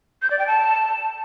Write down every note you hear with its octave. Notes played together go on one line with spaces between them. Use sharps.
G6
D5
G5
A5